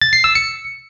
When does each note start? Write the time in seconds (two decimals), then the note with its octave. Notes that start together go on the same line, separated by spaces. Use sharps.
0.01 A6
0.13 C7
0.24 E6
0.35 C#7